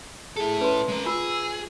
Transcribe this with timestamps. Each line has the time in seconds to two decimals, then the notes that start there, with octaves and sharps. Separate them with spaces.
0.36 E4 G#4 A4
0.61 C#4 B4 C6
0.88 G#3 A#4
1.06 F4 G#4 E6